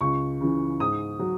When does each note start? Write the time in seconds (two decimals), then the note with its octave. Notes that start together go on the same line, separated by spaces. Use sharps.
0.01 C#2 C#6
0.41 C#3 E3
0.80 G#2 D#6
1.19 F#3